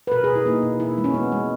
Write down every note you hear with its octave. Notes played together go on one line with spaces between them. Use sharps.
B4
B2 A#4
G#4
B2
E4
A#3 D#4
B2
B2 E4
G#3
C#4
G#3 B3
G#3